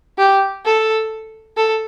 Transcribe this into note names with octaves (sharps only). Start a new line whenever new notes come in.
G4
A4
A4